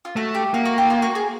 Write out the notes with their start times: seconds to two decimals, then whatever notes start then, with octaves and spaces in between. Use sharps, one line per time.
0.05 F4
0.16 A3 F#4
0.35 G4
0.54 A#3 F#4
0.65 F#4
0.78 G4
0.90 F4
1.02 F#4
1.15 G#4